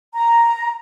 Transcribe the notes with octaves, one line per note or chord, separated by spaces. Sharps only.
A#5